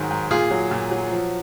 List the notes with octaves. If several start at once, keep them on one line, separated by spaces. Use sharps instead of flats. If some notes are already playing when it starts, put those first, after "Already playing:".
Already playing: G#2 D#3 F#3 G#4
G#2
A#2 F4 G#4
F#3
A#2
F#3
F3